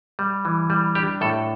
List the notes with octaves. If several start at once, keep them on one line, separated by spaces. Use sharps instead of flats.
G3
E3
G3
D4 G4
A2 A4